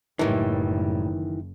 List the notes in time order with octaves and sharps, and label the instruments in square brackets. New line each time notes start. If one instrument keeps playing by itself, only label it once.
[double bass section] F#1 [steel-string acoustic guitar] A2 G3 [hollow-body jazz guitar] D#3 E3